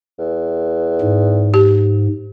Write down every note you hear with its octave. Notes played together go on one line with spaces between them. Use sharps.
E2
G#2
G4